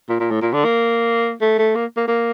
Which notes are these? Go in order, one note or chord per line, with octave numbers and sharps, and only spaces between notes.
A#2
A#2
A2
A#2
D3
A#3
A3
A3
A#3
A#3
A#3